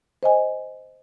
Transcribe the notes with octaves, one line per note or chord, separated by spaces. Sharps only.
C5 D#5 G#5